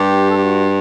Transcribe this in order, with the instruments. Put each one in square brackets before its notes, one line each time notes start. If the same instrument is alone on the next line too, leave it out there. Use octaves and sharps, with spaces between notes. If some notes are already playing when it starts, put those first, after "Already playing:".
Already playing: [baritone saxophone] G2 [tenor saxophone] G4
[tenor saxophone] A4
G4
F#4